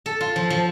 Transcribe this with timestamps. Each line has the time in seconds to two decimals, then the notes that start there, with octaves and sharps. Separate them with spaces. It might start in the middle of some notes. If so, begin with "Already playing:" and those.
0.06 A4
0.21 F4
0.36 F3
0.50 F3